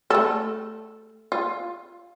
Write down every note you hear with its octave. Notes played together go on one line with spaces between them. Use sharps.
A3 A4
F4